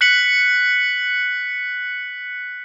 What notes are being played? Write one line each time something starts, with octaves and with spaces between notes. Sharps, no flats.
F#6 B6 C#7 F#7